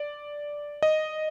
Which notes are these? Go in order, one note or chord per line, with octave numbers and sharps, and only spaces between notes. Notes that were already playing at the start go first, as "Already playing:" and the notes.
Already playing: D5
D#5